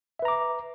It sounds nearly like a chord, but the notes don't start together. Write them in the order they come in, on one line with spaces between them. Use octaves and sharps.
E5 B4 A#5 D6